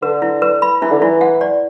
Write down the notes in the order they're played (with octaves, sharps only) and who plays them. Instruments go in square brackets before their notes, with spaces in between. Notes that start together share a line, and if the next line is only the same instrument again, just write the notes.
[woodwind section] D3 [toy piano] B4
[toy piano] E4
B4
B5
[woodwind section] E3 [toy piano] E4
[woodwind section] D3
[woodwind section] E3 [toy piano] E4
[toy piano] F#5
D5